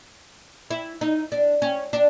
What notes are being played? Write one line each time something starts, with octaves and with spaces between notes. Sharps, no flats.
E4
D#4
D4
C#4
D4